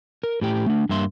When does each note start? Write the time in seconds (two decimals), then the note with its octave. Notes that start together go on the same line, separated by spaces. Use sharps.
0.23 A#4
0.41 A2 G4 G5
0.67 A3 D4
0.89 G2 A#3 E5 C6